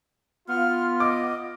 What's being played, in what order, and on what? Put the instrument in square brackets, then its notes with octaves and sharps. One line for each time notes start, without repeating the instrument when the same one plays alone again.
[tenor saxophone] B3 [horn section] F4 [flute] F6
[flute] D#5 [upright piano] D6